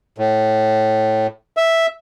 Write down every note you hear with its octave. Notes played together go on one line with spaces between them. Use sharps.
A2
E5